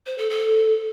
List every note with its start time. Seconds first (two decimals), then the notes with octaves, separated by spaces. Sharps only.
0.06 C5
0.18 A4
0.30 A4